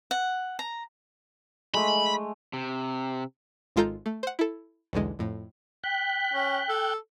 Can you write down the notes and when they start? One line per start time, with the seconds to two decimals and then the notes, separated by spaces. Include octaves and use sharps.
0.11 F#5
0.59 A#5
1.74 G#3 A3 B5
2.53 C3
3.76 G#1 G#3 F4 A4 A#5 G6
4.06 A3
4.23 C5 F#5
4.39 E4 A4
4.93 B1 E2 D3 G#3
5.19 F2 A2
5.84 G5 F#6 B6
6.34 C#4
6.69 A4